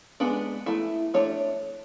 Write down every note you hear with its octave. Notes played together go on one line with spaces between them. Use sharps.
G#3 B3 D4
A3 E4
A3 D4 C#5